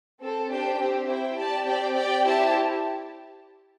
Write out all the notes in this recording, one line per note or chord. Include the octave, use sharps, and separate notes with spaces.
C4 A4 C5
D4 G4 C5 G5
C4 G4 C5
E4 C5 G5
G4 D5 A5
C4 G4 D5 G5
G4 D5 G5
E4 G4 C5 A5